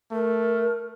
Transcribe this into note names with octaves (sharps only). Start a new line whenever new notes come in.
A3 A#4